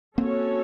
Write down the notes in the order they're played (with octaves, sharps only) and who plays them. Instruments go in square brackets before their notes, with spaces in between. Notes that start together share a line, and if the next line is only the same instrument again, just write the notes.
[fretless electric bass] A#3 C4 [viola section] C#4 F#4 A4 C#5